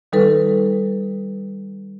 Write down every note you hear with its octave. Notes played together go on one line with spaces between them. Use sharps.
D#3 G3 D#4 A4 B4